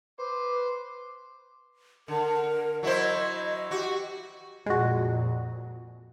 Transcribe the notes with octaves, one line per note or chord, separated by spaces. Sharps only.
B4 C5 D6
D3 A#4
F#3 E4 C5 D#5
F#4 G4
F2 A#2 G#3 F#4